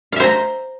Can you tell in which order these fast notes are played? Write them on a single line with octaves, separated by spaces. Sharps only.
F5 E5 C5 A#5